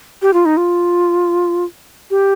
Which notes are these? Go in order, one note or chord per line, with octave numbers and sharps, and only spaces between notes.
G4
F4
D#4
F4
G4